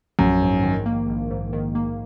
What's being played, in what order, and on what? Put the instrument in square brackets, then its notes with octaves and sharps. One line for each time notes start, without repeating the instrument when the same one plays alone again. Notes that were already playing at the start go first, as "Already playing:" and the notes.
[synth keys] A#1 [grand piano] F#2
[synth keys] G#2
D#3
A#3
A#1
G#2
D#3
A#3